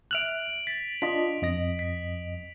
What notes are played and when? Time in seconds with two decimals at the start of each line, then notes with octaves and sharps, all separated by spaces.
0.11 E5 F6 F#6 D7 F7 F#7
0.67 A6 B6
1.02 D4 F4 D#5 B6
1.42 F2 D#5 A#6
1.79 B6